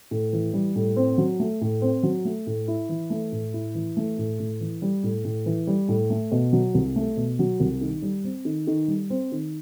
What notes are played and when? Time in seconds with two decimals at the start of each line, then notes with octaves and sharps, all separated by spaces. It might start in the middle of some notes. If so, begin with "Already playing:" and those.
0.11 A2
0.33 E3
0.53 G3
0.76 A2
0.96 C4
1.18 F#3
1.40 A3
1.61 A2
1.82 C4
2.03 F#3
2.25 A3
2.47 A2
2.68 E4
2.89 E3
3.10 A3
3.32 A2
3.53 E4
3.75 E3
3.97 A3
4.18 A2
4.39 A2
4.60 E3
4.82 G3
5.03 A2
5.25 A2
5.46 E3
5.67 G3
5.88 A2
6.10 A3
6.32 B2
6.53 F#3
6.75 C2
6.96 A3
7.17 B2
7.39 F#3
7.60 C2
7.81 D#3
8.02 G3
8.24 C4
8.45 D#3
8.67 D#3
8.88 G3
9.10 C4
9.32 D#3